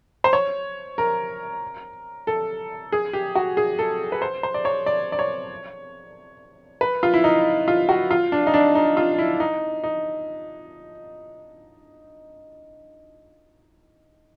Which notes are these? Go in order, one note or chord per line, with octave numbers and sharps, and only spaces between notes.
C5
C#5
A#4
A4
G#4
G4
F#4
G#4
A4
B4
C5
C5
D5
C#5
D5
D5
C#5
B4
F4
E4
D#4
F4
F#4
F4
D4
D#4
D4
D#4
F4
E4
D#4
D#4